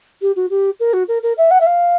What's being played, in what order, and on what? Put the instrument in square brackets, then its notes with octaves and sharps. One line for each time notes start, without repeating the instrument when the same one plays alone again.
[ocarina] G4
F#4
G4
A#4
F#4
A#4
A#4
E5
F#5
E5
F5